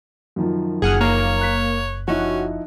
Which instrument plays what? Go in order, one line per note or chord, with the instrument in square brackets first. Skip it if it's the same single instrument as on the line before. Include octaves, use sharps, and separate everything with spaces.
[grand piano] F#2 D#3 F3
[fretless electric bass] F#1 [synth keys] G#4 F#5 F6
[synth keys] A#3 [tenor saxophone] C#5
[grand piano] F#6 B6
[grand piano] F3 D#4 E4 [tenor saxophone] C#4 [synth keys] F#4